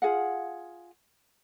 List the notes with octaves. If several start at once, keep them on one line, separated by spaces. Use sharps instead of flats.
F4 G#4 F5 F#5